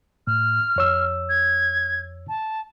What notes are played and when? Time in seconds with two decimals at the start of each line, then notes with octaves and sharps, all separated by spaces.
0.27 A2 F6
0.76 F2 C#5 E6
1.29 G#6
2.28 A5